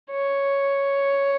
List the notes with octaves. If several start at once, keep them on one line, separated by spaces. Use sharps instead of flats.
C#5